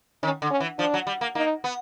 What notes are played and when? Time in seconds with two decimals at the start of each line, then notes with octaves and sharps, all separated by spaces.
0.23 D#3 C#4
0.42 D3
0.51 C#4
0.60 E3
0.79 F3 D4
0.94 F#3
1.07 G3
1.21 A#3
1.35 A#3 D#4
1.64 B3